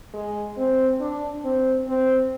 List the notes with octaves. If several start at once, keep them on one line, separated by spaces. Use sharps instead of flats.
G#3
C4
D4
C4
C4